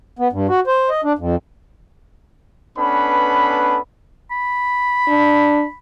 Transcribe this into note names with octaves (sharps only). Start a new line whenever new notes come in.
B3
G2
F#4
C5
D#5
D4
F2
B3 C#4 D4 A4 B4 B5
B5
D4